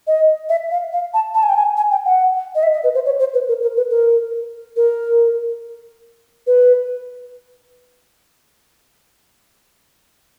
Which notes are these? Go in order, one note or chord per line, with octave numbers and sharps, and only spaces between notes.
D#5
E5
F5
F5
A5
A5
G#5
G5
G#5
G#5
G5
F#5
D#5
E5
D#5
B4
C5
C#5
C5
B4
A#4
A#4
B4
A#4
A#4
B4